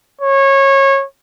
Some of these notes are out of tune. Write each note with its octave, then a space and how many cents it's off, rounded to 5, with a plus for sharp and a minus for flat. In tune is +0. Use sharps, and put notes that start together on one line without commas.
C#5 -20